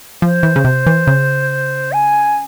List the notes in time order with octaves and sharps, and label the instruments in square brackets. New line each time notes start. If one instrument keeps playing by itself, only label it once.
[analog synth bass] F3 [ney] C5
[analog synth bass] E3
C#3
C3
E3
C#3
[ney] G#5